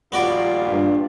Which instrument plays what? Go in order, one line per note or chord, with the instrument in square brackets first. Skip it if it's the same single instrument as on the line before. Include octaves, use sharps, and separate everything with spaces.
[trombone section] A#1 D#2 F4 [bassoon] G3 [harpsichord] B3 F#4 D5
[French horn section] G2